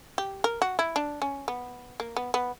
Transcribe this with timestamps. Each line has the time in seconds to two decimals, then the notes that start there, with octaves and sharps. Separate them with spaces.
0.18 G4
0.44 A#4
0.62 F#4
0.79 E4
0.96 D4
1.22 C#4
1.48 B3
2.00 A#3
2.17 B3
2.34 B3